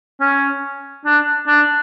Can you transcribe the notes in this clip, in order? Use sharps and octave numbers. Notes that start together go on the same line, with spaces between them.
C#4
D4
D4